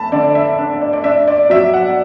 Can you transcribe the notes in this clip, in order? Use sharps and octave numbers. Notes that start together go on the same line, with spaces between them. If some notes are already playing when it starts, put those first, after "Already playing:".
Already playing: A3 A5 B5
D3 D5
E5
D4
D5
D5
D4 E5
D5
F#3 E5
F#5